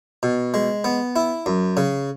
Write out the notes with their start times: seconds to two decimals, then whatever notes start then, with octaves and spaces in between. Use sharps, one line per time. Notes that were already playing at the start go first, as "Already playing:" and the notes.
0.23 B2
0.54 G#3
0.84 B3
1.16 E4
1.46 F#2
1.77 C#3